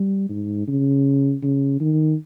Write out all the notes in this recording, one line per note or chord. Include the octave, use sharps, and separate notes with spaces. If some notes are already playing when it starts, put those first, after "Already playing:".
Already playing: G3
G#2
C#3
C#3
D#3